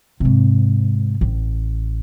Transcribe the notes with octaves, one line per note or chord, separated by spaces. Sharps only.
G#2 C3
A1